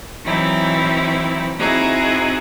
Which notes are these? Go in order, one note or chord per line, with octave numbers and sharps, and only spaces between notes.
E3 F#3 C4 D#4 E4
C4 D#4 E4 F#4 G#4